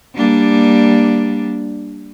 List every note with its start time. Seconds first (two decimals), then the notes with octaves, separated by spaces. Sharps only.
0.15 G3 A#3 D4